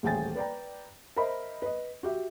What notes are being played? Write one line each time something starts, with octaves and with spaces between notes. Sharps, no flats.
D#1 A1 G#4 G5 G#5 A6
B4 D5 G5 A#5
A#4 C5 D#5 E5 B5
B4 D#5
F#4 G4 E5